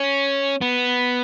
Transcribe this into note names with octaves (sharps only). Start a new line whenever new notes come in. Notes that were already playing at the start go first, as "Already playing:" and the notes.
Already playing: C#4
B3